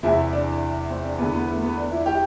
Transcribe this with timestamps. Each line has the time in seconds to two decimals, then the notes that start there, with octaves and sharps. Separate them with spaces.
0.03 E2 C3 E3 E4
0.33 D4
0.90 C4
1.05 D4
1.18 E2 D3 B3
1.33 B3
1.49 A3
1.62 B3
1.77 D4
1.91 E4
2.06 G4